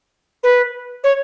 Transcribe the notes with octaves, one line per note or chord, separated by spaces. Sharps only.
B4
C#5